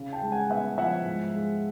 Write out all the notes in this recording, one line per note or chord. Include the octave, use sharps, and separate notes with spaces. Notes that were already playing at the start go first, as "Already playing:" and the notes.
Already playing: C#3
G5 A5
G#3
F#5 G#5
B3 E5 F#5
F3 E5 F#5
G#2
G#3